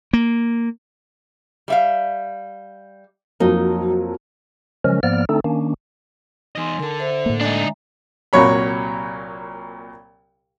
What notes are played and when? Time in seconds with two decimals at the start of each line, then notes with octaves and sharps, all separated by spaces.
0.13 A#3
1.68 G3 E5 F5
3.40 F2 F#3 A#3 D#4
4.84 C#3 F3 F#3 G#3 C#4 A#4
5.03 G#2 F3 A#3 B3 D5 F6
5.29 D3 A3 C4 D4 D#4 A4
5.44 D#3 A#3 C#4 D4
6.56 E2 D#4 D#5 G#5 C6
6.80 D3 A4 A#4 A5
7.00 C5 E5
7.26 A2 A#3
7.41 G#3 D4 D#4 E5 A#5
8.33 C2 A#2 F#3 C#5 B5